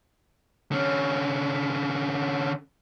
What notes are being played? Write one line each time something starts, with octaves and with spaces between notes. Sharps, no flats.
D3 C#4